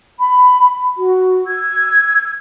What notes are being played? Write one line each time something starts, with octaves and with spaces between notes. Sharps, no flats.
B5
F#4
E6 G#6